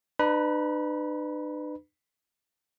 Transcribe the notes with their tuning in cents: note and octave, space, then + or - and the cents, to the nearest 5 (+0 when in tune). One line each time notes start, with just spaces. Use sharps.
D4 +45 B4 +20 B5 -30